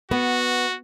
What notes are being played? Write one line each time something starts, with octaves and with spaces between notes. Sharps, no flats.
B3 F#4